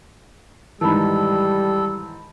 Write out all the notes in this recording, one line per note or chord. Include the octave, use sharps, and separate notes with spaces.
G#2 D#3 E3 G3 A4 A5 B5